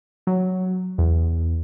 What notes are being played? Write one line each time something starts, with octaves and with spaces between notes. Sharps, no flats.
F#3
E2